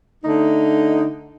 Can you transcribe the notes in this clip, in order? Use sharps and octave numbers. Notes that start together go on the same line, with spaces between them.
D3 A3 D#4